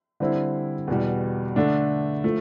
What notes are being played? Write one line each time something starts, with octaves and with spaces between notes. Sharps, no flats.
D3 G3 C4 E4
E2 B2 G3
D3 A3 D4
F3 A3